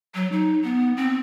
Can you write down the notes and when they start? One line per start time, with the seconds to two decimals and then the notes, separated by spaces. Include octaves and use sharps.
0.15 F#3
0.32 D#4
0.64 B3
0.97 C4